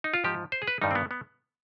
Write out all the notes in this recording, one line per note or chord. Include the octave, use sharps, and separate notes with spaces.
D#4
F4
G#2 F3 G4
C5
G#4
B4
G2 D#3 G3 D#4
C4
B3
B3